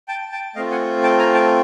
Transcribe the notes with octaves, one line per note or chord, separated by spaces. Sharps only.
G5 A5
G5 A5
A3 C4 F4 D#5 F5
F#5 G#5
G5 A5
G#5 A#5
G5 A5